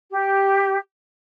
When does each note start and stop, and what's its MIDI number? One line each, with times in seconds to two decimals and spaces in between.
0.12 0.77 67